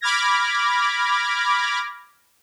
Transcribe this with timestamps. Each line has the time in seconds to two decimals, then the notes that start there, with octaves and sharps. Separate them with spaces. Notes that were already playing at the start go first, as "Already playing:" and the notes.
0.01 B5 D6 F6 G#6 A#6